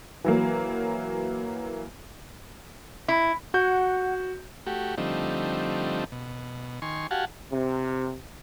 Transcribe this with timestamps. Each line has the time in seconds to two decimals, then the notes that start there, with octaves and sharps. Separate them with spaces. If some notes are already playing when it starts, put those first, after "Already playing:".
0.24 E3 F#3 A#3
3.08 E4
3.54 F#4 F#5 G6
4.67 A3 F#4 G4
4.98 D3 F3 G3 A3 C4 D#4
6.12 B2
6.82 D#3 G#5 C6 C#6
7.11 F#4 G4 F5 F#5 G#5 A5
7.51 C3